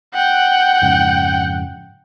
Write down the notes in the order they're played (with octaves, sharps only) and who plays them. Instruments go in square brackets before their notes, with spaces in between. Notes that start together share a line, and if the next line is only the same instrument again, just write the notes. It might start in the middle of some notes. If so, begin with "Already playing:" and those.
[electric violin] F#5 G5
[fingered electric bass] F2 G#2 C#3